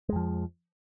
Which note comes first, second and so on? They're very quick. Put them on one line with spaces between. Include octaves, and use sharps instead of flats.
G#3 F2 F3